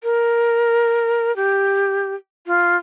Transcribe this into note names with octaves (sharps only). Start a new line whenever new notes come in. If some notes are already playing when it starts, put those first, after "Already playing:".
A#4
G4
F4